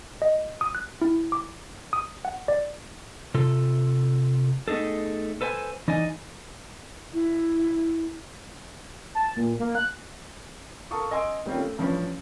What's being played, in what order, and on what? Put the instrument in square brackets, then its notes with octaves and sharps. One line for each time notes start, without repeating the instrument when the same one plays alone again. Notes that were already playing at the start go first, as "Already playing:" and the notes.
[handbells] D#5
D#6
F#6
E4
D6
D#6
F#5
D5
[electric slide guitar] C3 F4 A4
A3 B3 D#4 G#4 A4
A4 B4 C5 F#5 G#5
E3 D#4 D5 D#5 G#5
[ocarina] E4
[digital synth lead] A5
A#2
A#3
F#6
[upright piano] A4 A#4 F5 A5 C#6 D#6
D#5 G#5 C6 E6 D7
D#3 G3 C4 C#4 F4
A3
A1 G2 F3 C#4 B4